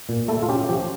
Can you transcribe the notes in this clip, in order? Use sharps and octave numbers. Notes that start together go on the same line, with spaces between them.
A#2
A3 E4 A4
F4
C#4 G4
F3 G4